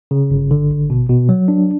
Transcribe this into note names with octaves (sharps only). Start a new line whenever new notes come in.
C#3
G1
D3
G#1
B2
B2
F#3
D4